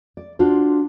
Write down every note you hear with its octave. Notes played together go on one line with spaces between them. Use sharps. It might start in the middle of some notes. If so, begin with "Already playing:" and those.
D5
D4 F4 F#4 C5